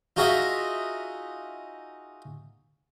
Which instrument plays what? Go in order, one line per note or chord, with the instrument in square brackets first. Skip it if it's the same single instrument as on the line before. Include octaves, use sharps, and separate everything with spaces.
[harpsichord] D#4 F4 F#4 G#4 D#5 E5